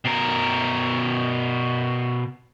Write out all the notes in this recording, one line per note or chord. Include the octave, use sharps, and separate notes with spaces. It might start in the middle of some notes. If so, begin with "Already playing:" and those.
B2 A#4